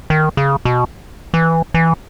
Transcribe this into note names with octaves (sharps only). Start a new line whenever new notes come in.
D#3
C#3
B2
E3
E3